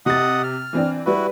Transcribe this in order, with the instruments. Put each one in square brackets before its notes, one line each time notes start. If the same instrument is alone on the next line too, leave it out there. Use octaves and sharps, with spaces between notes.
[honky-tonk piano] C3 A6 [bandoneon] D#5 F#5 D#6
[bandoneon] F6
[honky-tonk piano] E3 C4 D4
[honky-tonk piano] G3 B4 [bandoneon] E4 F#4